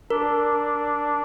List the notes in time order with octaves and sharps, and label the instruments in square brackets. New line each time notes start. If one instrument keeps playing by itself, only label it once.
[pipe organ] D4 [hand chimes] A#4